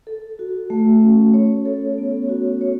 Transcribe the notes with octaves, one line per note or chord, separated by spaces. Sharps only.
A4
F#4
A3
C#4
C#5
A4
B3
F#4
C#5